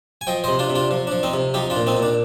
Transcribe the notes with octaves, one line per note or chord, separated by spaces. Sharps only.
G#5
F3 D#5 G5
C3 C5 D#5
D4 F4
C3
D4 F4
F3
F3 D4
C4 D#4
C3
F3 D#4 G4
D4 F4
A#2
C4 D#4
A#2
D4